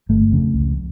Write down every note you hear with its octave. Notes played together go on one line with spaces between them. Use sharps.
G1 A3
F2 C#3
C#2